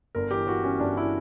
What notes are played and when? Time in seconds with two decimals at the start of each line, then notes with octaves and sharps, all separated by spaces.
0.15 G1 A#4
0.31 E3 G4
0.47 E3 F#4
0.64 E3 C#4
0.80 G1 D4
0.97 E4